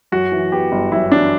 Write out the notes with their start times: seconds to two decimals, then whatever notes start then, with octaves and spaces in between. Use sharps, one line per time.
0.12 F#2 F#4
0.32 E3
0.52 B3 G4
0.72 G1
0.92 F#2 E4
1.12 E3 D4